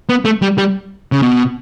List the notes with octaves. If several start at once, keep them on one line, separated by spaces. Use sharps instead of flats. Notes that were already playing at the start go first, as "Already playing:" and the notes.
B3
A3
G3
G3
C#3
B2